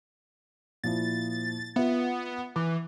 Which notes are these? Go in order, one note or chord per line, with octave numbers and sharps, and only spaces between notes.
A#2 F3 E4 A6
B3 F4 B4 E5
E3 D6